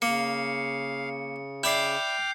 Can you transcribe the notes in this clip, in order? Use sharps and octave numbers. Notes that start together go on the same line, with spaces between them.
C#3 A#3 F5 C#7
E4 D5 G5 D6 F6 G6 C7